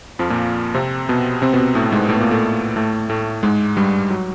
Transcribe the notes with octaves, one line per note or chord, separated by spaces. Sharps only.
F2 F3
A#2 A#3
C3 C4
B2 B3
C3 C4
B2 B3
A2 A3
G#2 G#3
A2 A3
B3
A#2 A#3
A2 A3
A2 A3
A2 A3
G#2 G#3
G2 G3
F#3